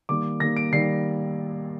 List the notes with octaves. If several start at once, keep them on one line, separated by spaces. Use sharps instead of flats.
D#3 G3 A#3 D6
D#3 G3 A#3 A#6
D7
D#3 G3 A#3 C7